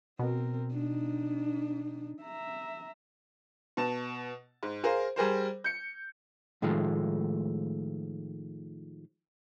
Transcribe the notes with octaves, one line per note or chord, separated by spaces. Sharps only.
B2 C4 A#4
D4 D#4
E5 A#5
B2 A5
G#2
G#4 A#4 C5 F5
G3 G#4 A#4 C5
G6 C#7
A2 D#3 F3 G#3 A3